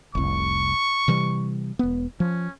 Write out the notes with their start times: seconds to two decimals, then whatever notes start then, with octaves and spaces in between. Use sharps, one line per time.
0.15 F1 C2 C#6
1.08 C3 E3 G3
1.79 E1 B3
2.20 F3 C#4